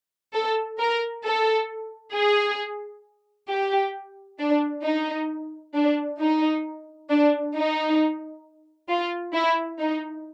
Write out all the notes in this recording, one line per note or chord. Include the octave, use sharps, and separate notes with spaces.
A4
A#4
A4
G#4
G4
D4
D#4
D4
D#4
D4
D#4
F4
E4
D#4